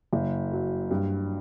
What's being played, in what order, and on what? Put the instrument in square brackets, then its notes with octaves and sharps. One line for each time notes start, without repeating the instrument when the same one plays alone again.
[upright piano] F#1
F#3
G2